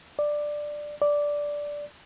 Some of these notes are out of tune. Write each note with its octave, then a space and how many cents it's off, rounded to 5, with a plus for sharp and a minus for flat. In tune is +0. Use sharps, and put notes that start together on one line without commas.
D5 +10
D5 -5